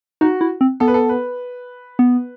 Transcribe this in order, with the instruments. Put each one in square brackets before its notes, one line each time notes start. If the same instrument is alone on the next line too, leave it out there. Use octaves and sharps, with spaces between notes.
[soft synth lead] D#4 [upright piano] F#4
[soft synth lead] E4
C4
[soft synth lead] B3 [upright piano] A4
[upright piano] B4
A4
B4
[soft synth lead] B3